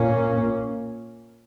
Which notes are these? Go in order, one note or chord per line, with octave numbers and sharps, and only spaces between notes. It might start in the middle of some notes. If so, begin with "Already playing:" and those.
Already playing: A#2 A#3 C#4